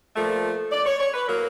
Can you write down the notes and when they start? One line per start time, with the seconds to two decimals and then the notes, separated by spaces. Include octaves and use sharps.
0.15 A#2 F3 A3
0.72 D5
0.86 C#5
1.00 C#5
1.14 B4
1.28 A2 F#3 A#3 A#4